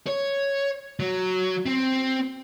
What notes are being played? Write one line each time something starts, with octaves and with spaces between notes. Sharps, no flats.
C#5
F#3
C4